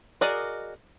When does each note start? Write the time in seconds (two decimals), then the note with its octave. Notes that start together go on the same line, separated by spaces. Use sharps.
0.21 F#4 G#4 A#4 D5 D#5